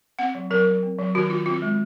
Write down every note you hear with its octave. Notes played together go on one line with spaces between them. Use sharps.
C4 F#5
F#3
F#3 A#4
F#3
C4
F#3
D#3 F#4
D#3 F4
C4 F4
G#3